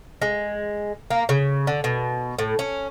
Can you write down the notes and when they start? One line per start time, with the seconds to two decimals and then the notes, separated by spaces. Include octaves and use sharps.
0.22 G#3
1.10 A#3
1.29 C#3
1.67 D3
1.84 B2
2.39 A2
2.59 C#4